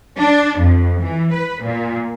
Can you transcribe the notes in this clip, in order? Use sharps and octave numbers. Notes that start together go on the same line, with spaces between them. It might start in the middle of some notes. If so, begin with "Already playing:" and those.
D4
F2
E3
B4
A#2